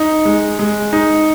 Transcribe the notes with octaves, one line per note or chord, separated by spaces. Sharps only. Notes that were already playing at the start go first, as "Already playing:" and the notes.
Already playing: D#4
G#3
G#3
D#4